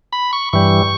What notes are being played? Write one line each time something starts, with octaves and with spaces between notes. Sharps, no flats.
B5
C#6
G2 E3 G3 C#6